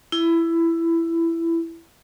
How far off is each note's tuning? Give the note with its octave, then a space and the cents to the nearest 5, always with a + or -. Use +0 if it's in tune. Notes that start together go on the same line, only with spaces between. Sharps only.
E4 +15